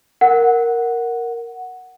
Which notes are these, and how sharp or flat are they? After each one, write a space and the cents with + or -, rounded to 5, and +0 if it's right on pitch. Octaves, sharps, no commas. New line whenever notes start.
A#4 +0 F#5 +0